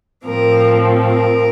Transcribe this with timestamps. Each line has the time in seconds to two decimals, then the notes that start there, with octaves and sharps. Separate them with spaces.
0.25 A2 F3 C4 A#4
1.02 A#4